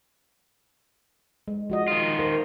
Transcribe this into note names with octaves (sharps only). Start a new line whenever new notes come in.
G#3
F3 F#4 D#5
D#3 F4
A#4 C5